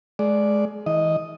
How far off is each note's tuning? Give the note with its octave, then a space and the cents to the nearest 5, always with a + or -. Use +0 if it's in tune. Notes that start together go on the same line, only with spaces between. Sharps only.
G#3 +20 D5 +0
E3 -35 D#5 +0